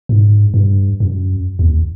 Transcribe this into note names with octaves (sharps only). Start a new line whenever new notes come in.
G#2
G2
F#2
D#2